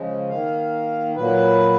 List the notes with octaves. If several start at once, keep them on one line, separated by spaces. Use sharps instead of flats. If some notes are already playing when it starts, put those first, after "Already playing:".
Already playing: C#3 F3 G#3
D#3 A#3 F5
A#2 F#3 A#3 B4